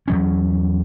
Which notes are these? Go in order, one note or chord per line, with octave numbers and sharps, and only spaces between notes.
E2 F#3 C#4